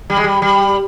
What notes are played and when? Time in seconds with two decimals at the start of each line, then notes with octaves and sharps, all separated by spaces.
0.10 G3
0.17 G#3
0.24 G3
0.42 G3